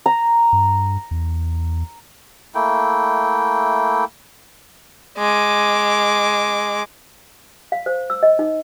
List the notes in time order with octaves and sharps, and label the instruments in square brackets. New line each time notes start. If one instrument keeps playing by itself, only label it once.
[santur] A#5
[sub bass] G2
E2
[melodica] A3 A#3 E4 G5
[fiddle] G#3 D6
[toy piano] F5
C5
E6
D#5
D#4